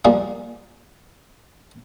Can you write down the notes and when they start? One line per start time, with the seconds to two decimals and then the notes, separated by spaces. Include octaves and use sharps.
0.05 F3 G3 A#3 G#4